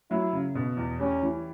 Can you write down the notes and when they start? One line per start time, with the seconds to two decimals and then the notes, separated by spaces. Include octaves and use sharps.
0.11 F#3 E4
0.33 C#3
0.55 B2
0.77 E2
0.99 G3 C#4
1.23 E3